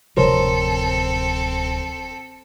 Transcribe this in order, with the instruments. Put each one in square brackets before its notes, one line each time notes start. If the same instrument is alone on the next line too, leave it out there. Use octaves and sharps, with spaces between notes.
[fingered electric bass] D1 C3 F3 [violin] C4 A4 [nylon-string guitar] A#4 C5 C#5